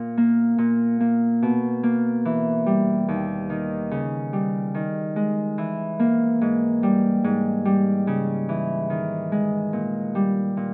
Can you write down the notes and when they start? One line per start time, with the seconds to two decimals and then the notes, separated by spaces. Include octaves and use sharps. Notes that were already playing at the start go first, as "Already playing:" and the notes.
Already playing: A#2
0.17 A#3
0.58 A#2
1.00 A#3
1.42 B2
1.83 A#3
2.25 E3
2.66 G3
3.08 D#2
3.50 D#3
3.91 C#3
4.33 G3
4.74 D#3
5.16 G#3
5.58 E3
5.99 A#3
6.41 G#2
6.83 G3
7.24 G#2
7.65 G3
8.07 C#3
8.49 E3
8.90 D#3
9.32 G#3
9.73 A#2
10.15 G3
10.57 A#2